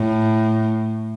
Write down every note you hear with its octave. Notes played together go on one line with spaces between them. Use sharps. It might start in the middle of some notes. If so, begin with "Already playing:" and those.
Already playing: A2